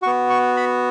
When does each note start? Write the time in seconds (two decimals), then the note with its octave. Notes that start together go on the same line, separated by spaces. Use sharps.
0.02 F#4 C#6
0.07 B3
0.30 C#6
0.57 B5